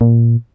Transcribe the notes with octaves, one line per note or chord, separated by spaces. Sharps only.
A#2